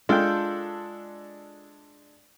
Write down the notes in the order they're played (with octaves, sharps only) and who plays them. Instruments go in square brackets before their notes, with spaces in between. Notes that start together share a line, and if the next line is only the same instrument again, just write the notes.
[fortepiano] G#3 D4 A4 [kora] F4 G5